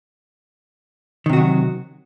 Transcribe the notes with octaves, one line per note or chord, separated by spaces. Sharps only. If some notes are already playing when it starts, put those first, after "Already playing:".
C3 D#3 F#3 F#4